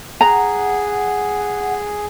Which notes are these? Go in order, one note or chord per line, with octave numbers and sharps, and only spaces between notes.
G#4 F#5 A#5